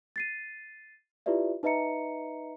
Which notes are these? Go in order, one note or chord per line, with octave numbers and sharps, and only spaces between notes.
A6 C7 D#7
E4 F4 G4 B4 D5 E5
D#4 B4 D#5 E5 A#5 C#7